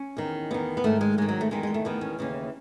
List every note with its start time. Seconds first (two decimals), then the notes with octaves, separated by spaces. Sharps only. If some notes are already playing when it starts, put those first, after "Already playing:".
Already playing: C#4
0.17 E2 D#3
0.51 E2 D#3 B3
0.77 B3
0.84 G#2 D#3 A3
1.01 G#3
1.18 G#2 D#3 G#3
1.29 F#3
1.41 A3
1.51 E2 D#3 G#3
1.63 G#3
1.74 A3
1.85 E2 D#3 B3
2.01 C#4
2.19 D#2 C#3 E3